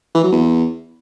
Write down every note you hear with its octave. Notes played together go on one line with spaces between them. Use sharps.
E3
F#3
E2